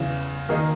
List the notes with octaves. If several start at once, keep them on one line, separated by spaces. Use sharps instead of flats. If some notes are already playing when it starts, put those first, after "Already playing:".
Already playing: E2 C#3 E3
D#3 A#3 D#4 G#4 D#5